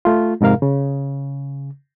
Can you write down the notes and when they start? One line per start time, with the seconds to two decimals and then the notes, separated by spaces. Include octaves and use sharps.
0.05 A3 F4
0.41 F2 G#2 C3 A#4 F5
0.62 C#3